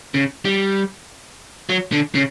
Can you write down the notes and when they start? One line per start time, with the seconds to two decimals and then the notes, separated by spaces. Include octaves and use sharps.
0.14 C#3
0.45 G3
1.69 F#3
1.92 D3
2.15 C#3